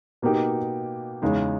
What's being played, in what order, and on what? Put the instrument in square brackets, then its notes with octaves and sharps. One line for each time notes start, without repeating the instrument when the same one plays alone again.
[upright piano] B2 A#3 D#4 G4
E2 C#3 G#3 D#4